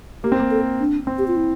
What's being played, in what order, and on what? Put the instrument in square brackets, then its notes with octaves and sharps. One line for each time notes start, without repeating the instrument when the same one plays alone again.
[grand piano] A#3 [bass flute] G4
[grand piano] C4
A#3
[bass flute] A4
D4
[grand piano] C4
[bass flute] G4
F4
E4